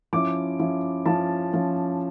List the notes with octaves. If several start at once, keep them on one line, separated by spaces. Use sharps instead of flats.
F3 C#4 E4 D6
F3 C#4 E4
F3 C#4 E4 A5
F3 C#4 E4